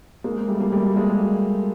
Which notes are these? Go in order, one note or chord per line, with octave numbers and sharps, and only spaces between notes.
G#3 A#3
G3 A3
A#3
G3 A3
G#3 A#3